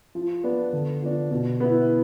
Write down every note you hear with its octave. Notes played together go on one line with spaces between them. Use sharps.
F3
B3 D4
D3
F3 B3 D4
B2
B3 E4